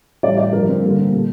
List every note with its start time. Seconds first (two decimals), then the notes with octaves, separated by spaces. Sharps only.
0.23 A2 E3 G3 D5
0.38 D5
0.53 G2 D3 F3 A#4
0.68 C4
0.82 G2 D3 G3 A#3
0.97 C4
1.12 A#2 G3 A4